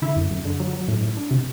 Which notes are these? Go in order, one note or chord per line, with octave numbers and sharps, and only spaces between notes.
D3 E4 E5
F#2
F#2
D3
F#3
F#3
A2
A2
D4
C3